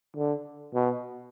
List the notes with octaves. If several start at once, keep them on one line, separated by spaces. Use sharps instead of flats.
D3
B2